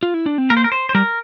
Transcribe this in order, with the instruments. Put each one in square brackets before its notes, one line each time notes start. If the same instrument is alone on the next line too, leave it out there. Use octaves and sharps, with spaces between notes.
[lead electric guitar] F4
E4
D4
C4
[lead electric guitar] A#3 [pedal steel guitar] A#4
[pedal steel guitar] C5
A#4
C5
C5
[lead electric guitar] G3 [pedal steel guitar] A#4